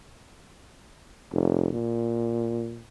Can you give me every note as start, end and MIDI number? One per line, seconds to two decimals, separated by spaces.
1.32 1.69 29
1.74 2.83 46